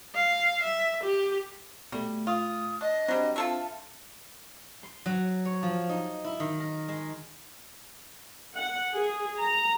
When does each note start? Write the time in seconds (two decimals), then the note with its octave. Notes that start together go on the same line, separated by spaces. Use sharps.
0.15 F5
0.63 E5
1.03 G4
1.92 B2 G3 A3
2.27 F4 D#6
2.81 D4 D#5
3.08 F#3 G3 C4 D4 C5
3.36 F4 A4 E5 A5
4.83 C6
5.06 F#3
5.45 C#5
5.63 F3
5.89 D#4
6.25 E4
6.40 D#3
6.60 A#4
6.89 G#3
8.55 F#5
8.93 G#4
9.40 A#5